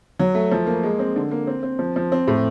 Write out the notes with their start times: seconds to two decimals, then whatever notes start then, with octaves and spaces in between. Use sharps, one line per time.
0.19 F#3
0.34 A3
0.52 F3
0.67 A#3
0.83 G#3
0.99 C4
1.16 D3
1.31 A#3
1.47 C4
1.63 C4
1.79 F3
1.96 F3
2.12 C4
2.28 A2